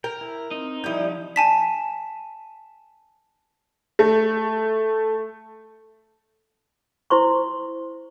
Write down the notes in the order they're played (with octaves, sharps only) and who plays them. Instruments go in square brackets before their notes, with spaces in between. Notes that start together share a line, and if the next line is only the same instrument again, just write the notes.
[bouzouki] A#4 [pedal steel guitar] G5
[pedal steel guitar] E4
[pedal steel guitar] C4 [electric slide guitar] D#4
[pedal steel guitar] F3 F4 G6 [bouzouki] G3 E4
[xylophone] G#5 A5 B6
[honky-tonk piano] A3
[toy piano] E4 C5 C6 C#6